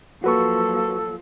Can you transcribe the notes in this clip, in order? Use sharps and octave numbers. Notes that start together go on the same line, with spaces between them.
F3 F#3 A#3 F#4 A4 B4 C#6